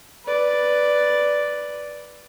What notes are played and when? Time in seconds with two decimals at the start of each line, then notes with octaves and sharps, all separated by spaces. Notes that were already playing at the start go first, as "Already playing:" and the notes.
0.25 B4 D5